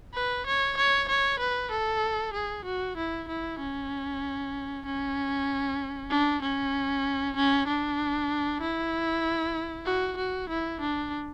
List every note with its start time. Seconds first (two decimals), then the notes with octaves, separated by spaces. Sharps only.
0.14 B4
0.47 C#5
0.78 C#5
1.09 C#5
1.39 B4
1.71 A4
2.34 G#4
2.65 F#4
2.97 E4
3.28 E4
3.60 C#4
4.86 C#4
6.10 D4
6.42 C#4
7.36 C#4
7.67 D4
8.61 E4
9.86 F#4
10.18 F#4
10.49 E4
10.81 D4